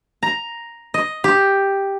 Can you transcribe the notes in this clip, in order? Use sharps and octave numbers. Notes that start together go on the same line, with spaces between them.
A#5
D#5
G4